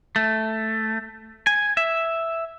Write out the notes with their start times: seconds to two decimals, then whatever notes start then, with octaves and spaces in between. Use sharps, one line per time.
0.16 A3
1.47 G#5
1.77 E5